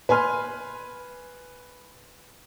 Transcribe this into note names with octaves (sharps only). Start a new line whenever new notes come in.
B4 G#5 C6 F6